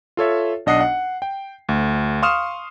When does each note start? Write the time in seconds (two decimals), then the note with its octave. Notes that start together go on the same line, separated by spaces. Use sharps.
0.17 F4 A4 C#5 E5
0.66 B1 D4 D#5 F#5 D#6 C7
0.80 F#5
1.22 G5
1.69 D2
2.22 F5 C6 C#6 D#6 F6 E7